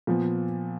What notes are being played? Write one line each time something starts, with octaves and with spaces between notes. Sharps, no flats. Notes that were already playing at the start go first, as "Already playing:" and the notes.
A#2 F3 B3